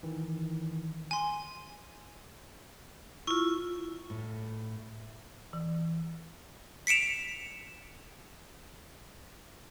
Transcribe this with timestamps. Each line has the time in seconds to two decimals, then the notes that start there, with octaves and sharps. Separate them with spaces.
0.03 D#3 E3
1.11 G#5 C6
3.27 E4 F4 C#6
4.10 A2
5.53 E3
6.87 B6 C#7 D7 E7 F7